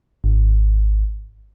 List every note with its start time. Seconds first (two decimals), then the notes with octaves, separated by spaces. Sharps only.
0.24 G#1